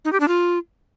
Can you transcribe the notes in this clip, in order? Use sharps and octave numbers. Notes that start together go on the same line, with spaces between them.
D#4
G4
D4
F4